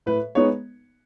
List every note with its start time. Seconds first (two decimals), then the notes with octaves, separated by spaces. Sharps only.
0.06 A2 B4
0.35 G#3 B3 D#4 C#5